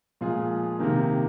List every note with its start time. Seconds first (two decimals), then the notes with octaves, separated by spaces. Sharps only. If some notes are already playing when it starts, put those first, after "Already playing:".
0.21 A#2 F3 G#3 F4 G#4
0.79 C3 D#3 A#3